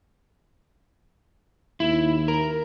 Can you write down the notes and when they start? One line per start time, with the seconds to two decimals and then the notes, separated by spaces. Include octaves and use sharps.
1.80 D#2 E4
2.28 A#4